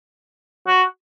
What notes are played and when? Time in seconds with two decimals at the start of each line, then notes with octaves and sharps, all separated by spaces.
0.67 F#4